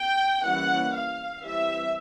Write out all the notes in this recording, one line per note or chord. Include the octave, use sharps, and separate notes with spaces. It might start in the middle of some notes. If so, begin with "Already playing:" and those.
Already playing: G5
E3 G3 A#3 C#4 F#5
F5
E3 G3 C4 E5